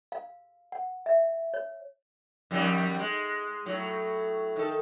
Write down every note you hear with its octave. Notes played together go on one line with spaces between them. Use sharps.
F5
F#5
E5
C#5
F2 D#3 G3
G#3
A2 F#3
D#3 A4